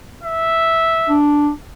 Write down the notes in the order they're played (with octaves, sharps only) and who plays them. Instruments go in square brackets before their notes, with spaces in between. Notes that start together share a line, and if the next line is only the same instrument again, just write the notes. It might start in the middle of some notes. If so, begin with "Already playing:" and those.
[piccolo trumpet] E5
[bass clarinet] D4